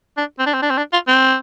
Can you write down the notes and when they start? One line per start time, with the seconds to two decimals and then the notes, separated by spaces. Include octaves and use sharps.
0.17 D4
0.39 C4
0.47 D4
0.54 C4
0.62 D4
0.70 C4
0.78 D4
0.93 F4
1.08 C4